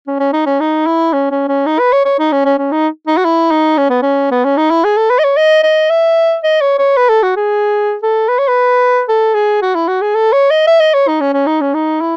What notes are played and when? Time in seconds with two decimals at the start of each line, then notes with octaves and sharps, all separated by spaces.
0.07 C#4
0.20 C#4
0.33 D#4
0.46 C#4
0.60 D#4
0.86 E4
1.13 C#4
1.31 C#4
1.48 C#4
1.66 D#4
1.79 B4
1.93 C#5
2.05 C#5
2.19 D#4
2.32 C#4
2.45 C#4
2.58 C#4
2.72 D#4
3.07 D#4
3.17 F#4
3.25 E4
3.51 D#4
3.78 C#4
3.90 B3
4.02 C#4
4.31 B3
4.45 C#4
4.57 D#4
4.71 E4
4.84 G#4
4.97 A4
5.10 B4
5.19 D#5
5.24 C#5
5.37 D#5
5.63 D#5
5.90 E5
6.44 D#5
6.61 C#5
6.78 C#5
6.97 B4
7.09 A4
7.23 F#4
7.37 G#4
8.03 A4
8.29 B4
8.39 C#5
8.48 B4
9.09 A4
9.35 G#4
9.62 F#4
9.75 E4
9.88 F#4
10.02 G#4
10.15 A4
10.33 C#5
10.50 D#5
10.67 E5
10.80 D#5
10.94 C#5
11.08 D#4
11.21 C#4
11.33 C#4
11.47 D#4
11.61 C#4
11.74 D#4
12.01 E4